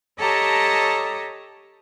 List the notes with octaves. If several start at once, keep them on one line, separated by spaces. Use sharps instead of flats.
G4 A4 C#5 D#5 A5 A#5